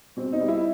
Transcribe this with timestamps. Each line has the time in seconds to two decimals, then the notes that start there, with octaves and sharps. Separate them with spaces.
0.17 B2 C4
0.33 D#4
0.41 G3
0.48 E4